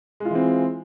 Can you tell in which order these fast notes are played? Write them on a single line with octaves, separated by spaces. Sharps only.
G#3 F4 E3 C4